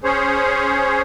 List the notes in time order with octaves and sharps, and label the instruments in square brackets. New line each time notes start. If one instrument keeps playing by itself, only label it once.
[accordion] C#4 G#4 C5 C#5